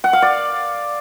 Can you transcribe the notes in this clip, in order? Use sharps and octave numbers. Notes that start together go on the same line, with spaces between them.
F#5
F5
D5